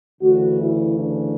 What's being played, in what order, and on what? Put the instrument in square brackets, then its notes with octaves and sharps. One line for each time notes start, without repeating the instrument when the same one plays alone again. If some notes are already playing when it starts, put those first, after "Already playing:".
[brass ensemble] D2 C#3 E3 F#4
E4
D4